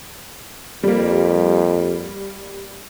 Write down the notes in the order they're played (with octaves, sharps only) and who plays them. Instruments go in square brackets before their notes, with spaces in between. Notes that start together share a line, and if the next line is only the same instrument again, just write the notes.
[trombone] F2 [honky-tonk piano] G3 A#3